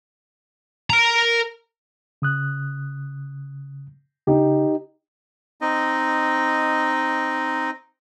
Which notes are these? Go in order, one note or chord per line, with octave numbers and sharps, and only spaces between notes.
A#4 A#5
C#3 D#6 F#6
C#3 D#4 G4
C4 D#4 D#5